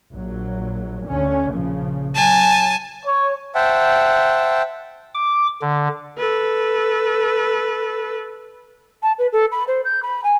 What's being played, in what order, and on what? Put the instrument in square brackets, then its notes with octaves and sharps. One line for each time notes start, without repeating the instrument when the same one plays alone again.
[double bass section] A#1 F#3
D2 D3 C#4
A#1 C#3 F3
[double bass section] F#3 [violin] G#5 A5
[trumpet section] C#5
[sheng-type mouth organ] C5 E5 F#5 G5 A5
[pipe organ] D6
D3
[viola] A4 B4
[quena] A5
B4
A4
B5
C5
G6
B5
G#5